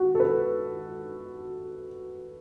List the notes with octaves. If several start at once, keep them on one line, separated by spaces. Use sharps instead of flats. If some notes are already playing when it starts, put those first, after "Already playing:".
Already playing: F#4
A4
B4